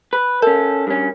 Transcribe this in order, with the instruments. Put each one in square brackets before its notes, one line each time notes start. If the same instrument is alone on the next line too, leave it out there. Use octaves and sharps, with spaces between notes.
[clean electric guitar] B4
[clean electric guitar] C#4 A4 [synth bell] A#4
[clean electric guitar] G2 C#4